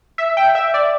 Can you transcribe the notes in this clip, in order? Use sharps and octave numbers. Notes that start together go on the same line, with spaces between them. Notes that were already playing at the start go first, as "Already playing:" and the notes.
E5
G5
E5
D5